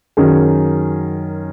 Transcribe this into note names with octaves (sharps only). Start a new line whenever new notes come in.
F#2 D#3 F#3 C#4 G#4